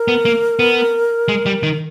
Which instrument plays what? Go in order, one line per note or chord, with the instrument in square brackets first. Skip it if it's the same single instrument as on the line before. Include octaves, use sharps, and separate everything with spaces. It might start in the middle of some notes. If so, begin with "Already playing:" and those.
Already playing: [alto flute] A#4
[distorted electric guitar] B3
A#3
B3
G#3
G3
D#3